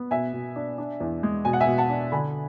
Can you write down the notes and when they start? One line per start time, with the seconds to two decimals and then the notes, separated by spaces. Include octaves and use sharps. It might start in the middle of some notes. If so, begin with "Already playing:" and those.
Already playing: B3
0.11 B2 E5 G#5
0.33 B2
0.56 D4
0.78 D4
1.00 E2
1.23 G#3
1.45 B2 G#5
1.53 F#5
1.61 E5 G#5
1.67 B2
1.78 F#5 A5
1.90 D4
2.12 D3 G#5 B5